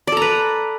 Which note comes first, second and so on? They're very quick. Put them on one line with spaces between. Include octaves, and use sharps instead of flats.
D5 A4 A#5 B4